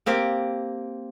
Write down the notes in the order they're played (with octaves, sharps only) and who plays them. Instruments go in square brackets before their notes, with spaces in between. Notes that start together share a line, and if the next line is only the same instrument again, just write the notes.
[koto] A#3 C4 G4